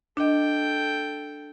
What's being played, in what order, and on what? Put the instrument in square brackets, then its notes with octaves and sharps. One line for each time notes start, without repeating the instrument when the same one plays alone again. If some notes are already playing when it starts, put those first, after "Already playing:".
[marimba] D4 D#5 [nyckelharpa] A4 G5